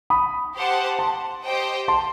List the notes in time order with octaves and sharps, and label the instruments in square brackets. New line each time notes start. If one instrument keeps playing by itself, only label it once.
[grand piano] B5 D#6
[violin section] G4 C5 F#5 A5
[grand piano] A5 C6
[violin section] G4 C5 D#5 G5
[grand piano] A5 C6